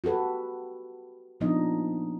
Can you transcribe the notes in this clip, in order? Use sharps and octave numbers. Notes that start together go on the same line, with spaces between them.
F#4 G4 A4 B4
A#2 F3 B3 D4 D#4 D#5